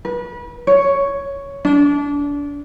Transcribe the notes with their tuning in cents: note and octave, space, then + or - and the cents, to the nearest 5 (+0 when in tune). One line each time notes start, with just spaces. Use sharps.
B4 -30
C#5 +5
D4 -30